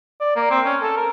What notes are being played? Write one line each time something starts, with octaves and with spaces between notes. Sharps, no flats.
D5
A#3
C4
C#4
A4
A#4